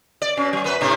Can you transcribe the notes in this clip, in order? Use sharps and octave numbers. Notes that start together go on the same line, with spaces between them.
D5
B2 C#4
F#3
F#2 B3 B4
G#2 C3 D4